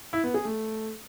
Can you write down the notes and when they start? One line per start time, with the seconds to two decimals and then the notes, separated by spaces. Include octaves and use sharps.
0.13 E4
0.24 B3
0.34 G#4
0.45 A3